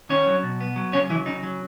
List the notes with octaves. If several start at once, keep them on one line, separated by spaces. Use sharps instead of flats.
D#3 C#4 C#5
F#3
B2
B3
F#3
C#3 C#4 C#5
E3 F#3 E4
C#3 D#4
F#3